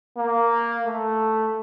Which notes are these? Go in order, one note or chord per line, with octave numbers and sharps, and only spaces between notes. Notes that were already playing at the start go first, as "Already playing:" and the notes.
A#3
A3